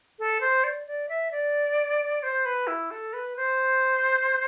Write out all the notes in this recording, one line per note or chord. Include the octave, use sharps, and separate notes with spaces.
A4
C5
D5
D5
E5
D5
C5
B4
E4
A4
B4
C5